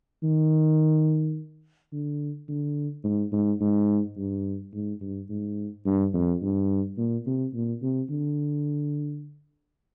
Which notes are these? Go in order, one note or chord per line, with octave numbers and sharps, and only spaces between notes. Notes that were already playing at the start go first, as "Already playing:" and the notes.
D#3
D3
D3
G#2
G#2
G#2
G2
G#2
G2
G#2
G2
F2
G2
A#2
C3
A#2
C3
D3